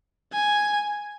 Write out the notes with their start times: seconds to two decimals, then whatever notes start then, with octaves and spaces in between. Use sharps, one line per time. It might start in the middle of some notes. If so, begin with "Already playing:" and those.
0.33 G#5